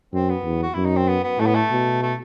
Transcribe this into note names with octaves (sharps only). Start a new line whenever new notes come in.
F#2 C4
B3
E2
F#4
F#2 E4
D#4
C4
B3
B3
A2 A3
B3
A3
B2
A3